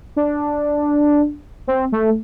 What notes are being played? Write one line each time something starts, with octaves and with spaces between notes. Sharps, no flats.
D4
C4
A3